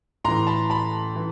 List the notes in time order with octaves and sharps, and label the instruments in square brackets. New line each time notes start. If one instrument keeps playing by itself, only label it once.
[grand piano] A2 E3 A#5 C6
A5 B5
A5 B5
E3